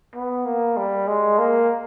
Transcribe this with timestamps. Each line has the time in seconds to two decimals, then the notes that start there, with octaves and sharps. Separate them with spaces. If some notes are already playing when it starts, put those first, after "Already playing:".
0.15 B3
0.46 A#3
0.77 G3
1.07 G#3
1.38 A#3